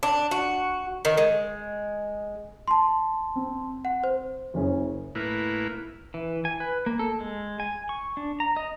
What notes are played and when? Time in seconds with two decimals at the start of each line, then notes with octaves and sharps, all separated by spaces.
0.03 D4
0.31 F#4
1.05 D#3
1.17 G#3
2.68 A5 C6
3.35 C4
3.85 F#5
4.04 C5
4.54 F#1 C#4 G#4
5.15 A2 A#3 E4 B4
6.14 E3
6.45 G#5
6.60 B4
6.86 A#3
6.99 A4
7.20 G#3
7.60 G#5
7.89 C#6
8.17 D4
8.40 A#5
8.57 D#5